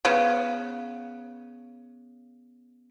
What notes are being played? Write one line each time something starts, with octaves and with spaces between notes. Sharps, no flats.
C#3 B3